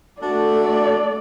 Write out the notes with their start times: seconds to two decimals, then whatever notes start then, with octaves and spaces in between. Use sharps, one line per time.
0.21 A3 D4 F#4 D5